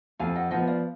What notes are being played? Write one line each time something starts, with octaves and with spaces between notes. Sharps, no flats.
F2 F5 G#5
D#5 F#5
F3 B3 D#5 F#5
D5 F5